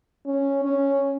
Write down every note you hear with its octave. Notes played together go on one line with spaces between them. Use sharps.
C#4
C#4